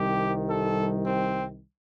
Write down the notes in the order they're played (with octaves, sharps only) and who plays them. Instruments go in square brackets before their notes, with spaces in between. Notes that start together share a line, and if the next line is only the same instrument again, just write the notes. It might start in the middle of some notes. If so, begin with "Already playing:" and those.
Already playing: [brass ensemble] C2 C3 D#3 G3 G4
A4
C4